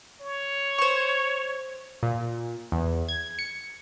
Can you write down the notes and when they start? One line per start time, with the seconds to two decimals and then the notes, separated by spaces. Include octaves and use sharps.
0.21 C#5
0.78 C5 C#6
2.03 A#2
2.72 E2
3.09 G#6
3.39 C#7